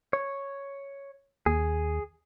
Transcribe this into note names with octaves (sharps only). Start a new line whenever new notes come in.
C#5
D#2 G#4